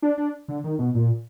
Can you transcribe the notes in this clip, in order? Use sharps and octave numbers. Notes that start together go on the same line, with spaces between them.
D4
D4
D3
D#3
B2
A#2